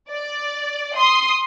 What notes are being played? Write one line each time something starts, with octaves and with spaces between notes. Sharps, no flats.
D5
C6 D#6